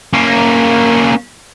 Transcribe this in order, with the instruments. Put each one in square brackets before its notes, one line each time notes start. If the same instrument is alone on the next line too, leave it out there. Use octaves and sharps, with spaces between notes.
[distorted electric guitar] A#3 C#4